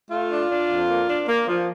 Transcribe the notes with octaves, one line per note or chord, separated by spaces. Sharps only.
A3 F4
D4
D4
F2
A#3
D4
A#3
F3